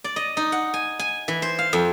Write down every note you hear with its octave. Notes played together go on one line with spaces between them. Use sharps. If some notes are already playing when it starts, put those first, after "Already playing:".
D5
D#5
D#4
F#5
G#5
G#5
E3
C5
F5
F2